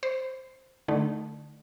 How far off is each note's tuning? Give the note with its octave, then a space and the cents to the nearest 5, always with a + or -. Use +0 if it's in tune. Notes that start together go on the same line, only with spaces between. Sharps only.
C5 +0 B5 +45
D3 +15 A3 -10 D#4 -5